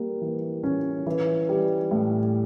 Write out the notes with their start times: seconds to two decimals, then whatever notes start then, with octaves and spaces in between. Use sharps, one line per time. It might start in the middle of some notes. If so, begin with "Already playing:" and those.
Already playing: G3 A#3
0.21 E3
0.63 C#4
1.06 E3
1.49 G3
1.91 A2